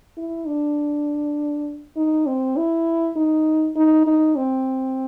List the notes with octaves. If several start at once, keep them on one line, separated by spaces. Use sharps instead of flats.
E4
D4
D#4
C4
E4
D#4
D#4
D#4
C4